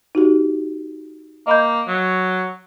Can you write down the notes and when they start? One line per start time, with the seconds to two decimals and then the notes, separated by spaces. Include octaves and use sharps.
0.15 D#4 F#4 G4
1.47 A#3 D#5 B5 G6
1.88 F#3